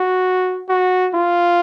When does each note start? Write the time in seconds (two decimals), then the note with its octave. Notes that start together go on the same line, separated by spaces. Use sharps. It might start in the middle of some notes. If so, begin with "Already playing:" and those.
Already playing: F#4
0.69 F#4
1.15 F4